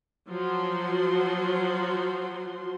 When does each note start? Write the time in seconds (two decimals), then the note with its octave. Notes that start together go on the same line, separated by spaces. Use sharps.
0.29 F3 F#3 F#4 C6